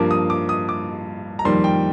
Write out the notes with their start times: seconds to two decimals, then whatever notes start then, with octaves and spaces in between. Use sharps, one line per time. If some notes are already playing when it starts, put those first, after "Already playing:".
Already playing: G2 F3 A#3 D6
0.11 D#6
0.30 D6
0.49 D#6
0.69 D6
1.39 A#5
1.45 F2 D#3 G3 A#3 C6
1.64 G5